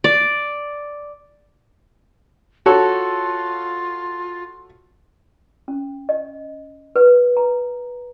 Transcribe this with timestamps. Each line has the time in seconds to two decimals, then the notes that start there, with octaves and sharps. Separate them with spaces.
0.04 D5
2.66 F4 F#4 A4 C#5
5.68 C#4
6.09 D#5
6.96 B4
7.37 A#5